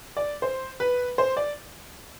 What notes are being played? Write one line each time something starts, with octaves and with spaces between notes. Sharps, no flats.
D5
C5
B4
C5
D5